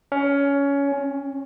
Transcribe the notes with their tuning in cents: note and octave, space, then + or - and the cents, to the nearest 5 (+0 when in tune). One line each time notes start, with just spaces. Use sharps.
C#4 +20
C#4 -40